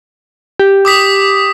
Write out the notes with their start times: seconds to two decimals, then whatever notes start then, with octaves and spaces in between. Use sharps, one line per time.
0.60 G4
0.85 D6 D#6 B6